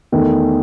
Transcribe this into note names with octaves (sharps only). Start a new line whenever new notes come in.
E2 D#3 A3